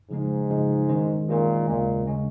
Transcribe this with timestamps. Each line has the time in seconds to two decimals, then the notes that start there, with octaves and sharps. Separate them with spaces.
0.10 G#2 C#3 F3 G#3 D#4
0.50 C#3 F3 G#3 D#4
0.89 D#3 G#3 C#4 G#4 C5
1.29 A#2 D#3 G#3 C#4 G#4 C5
1.69 D#2 A#2 C#3 G#3 C#4
2.07 C#3 G#3 C#4